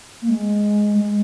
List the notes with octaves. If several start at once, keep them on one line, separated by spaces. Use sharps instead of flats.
A#3
G#3
G#3